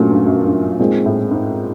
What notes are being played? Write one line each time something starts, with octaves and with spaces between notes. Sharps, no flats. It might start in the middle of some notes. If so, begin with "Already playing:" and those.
Already playing: G2 A#2 F#3 A3 C#4
G2
F#2
G2
A#2 G#3 C4 D#4 G#4
A2
G#2